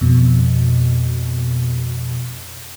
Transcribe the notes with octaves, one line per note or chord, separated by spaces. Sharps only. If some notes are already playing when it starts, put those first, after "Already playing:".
F2 B2